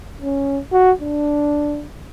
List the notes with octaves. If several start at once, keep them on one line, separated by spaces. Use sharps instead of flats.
C#4
F#4
D4